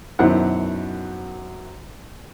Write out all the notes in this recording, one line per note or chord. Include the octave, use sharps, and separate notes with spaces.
F#2 B2 D#3 E4 C5 F#5